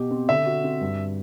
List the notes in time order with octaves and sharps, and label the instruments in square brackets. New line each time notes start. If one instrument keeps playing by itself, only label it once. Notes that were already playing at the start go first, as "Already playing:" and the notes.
Already playing: [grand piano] B2 G4
C4
[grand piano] D3 [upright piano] E5
[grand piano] F#4
C4
G2